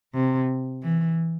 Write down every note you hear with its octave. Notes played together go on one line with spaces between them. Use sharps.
C3
E3